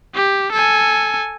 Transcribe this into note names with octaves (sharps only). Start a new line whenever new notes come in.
G4
A4 G#5